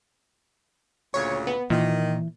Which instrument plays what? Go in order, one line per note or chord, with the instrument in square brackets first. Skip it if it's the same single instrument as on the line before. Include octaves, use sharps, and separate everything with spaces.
[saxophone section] D2 A#2 C#3 [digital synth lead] C#5
[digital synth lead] B3
[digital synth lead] A#2 [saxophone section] D#3 [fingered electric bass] E3